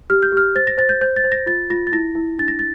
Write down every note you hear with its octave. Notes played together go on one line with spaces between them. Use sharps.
G4 F6
G6
G4 F6
C5 A6
A#6
C5 A6
G6
C5 G6
A6
C5
A#6
F4 A6
F4 A#6
A6
E4 A#6
E4
D4 A6
A#6
A6